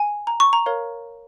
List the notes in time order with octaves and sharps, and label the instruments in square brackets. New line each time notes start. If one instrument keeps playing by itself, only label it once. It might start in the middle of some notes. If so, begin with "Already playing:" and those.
Already playing: [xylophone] G#5
A#5
C#6
A#5
A#4 C#5 F5